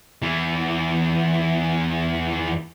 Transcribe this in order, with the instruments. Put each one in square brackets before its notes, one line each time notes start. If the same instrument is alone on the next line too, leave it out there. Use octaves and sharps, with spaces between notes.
[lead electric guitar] E2 E3